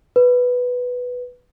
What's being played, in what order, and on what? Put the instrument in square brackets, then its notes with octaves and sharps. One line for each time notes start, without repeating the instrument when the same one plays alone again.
[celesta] B4